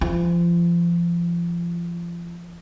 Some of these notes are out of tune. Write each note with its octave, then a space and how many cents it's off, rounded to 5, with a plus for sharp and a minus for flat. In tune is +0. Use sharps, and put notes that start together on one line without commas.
F3 -30